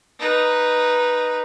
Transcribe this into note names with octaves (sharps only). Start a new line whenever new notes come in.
D#4 B4